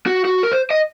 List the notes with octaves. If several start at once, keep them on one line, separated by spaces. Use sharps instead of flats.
F#4
F#4
A#4
C5
D#5